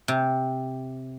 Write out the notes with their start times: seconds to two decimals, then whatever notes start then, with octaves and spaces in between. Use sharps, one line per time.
0.08 C3